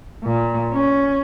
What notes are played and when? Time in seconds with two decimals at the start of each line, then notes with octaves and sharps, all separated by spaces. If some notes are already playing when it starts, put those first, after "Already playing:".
0.24 A#2
0.72 C#4